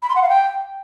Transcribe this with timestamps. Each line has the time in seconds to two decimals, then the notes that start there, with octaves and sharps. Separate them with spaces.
0.02 B5
0.09 C6
0.16 F#5
0.22 F5
0.29 G5